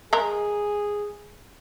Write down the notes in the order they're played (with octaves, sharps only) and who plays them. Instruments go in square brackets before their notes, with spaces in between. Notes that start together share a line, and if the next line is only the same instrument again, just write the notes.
[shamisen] G#3 A#4 [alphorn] G#4